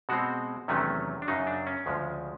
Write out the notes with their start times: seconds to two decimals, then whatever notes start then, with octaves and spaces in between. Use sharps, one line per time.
0.09 B2 G#3 C4 F#4
0.68 E2 C3 D#3 F#3 A3 C#4
1.22 D4
1.28 F#2 C#3 F#3 D#4
1.47 D4
1.67 C#4
1.86 D2 C#3 F3 G#3